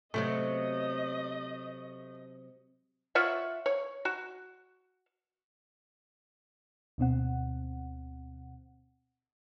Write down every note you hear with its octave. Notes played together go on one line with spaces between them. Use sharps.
C3 F#3 A3 B3 D#5
F4 C#5 E5 F#5
C#5
F#4
D2 B2 C4 F#5